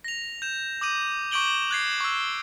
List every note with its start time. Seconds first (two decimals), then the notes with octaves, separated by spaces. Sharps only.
0.04 A#6 F7
0.42 G6 E7
0.81 D6 D#6 G6 D#7
1.31 C#6 D6 G6 D7 F#7 G7
1.71 F#6 G#6 C7
2.00 C#6 E6